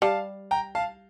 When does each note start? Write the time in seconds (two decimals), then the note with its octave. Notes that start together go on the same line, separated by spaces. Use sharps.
0.02 G3 F5 A5
0.51 G5 A#5
0.75 F5 A5